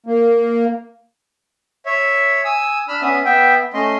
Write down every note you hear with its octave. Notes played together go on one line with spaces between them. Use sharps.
A#3
C#5 E5
G#5 D#6 E6
D4 B5 E6 F6
B3 C#4 E5 D#6
B3 E5 G5
A3 C#4 D#5 C6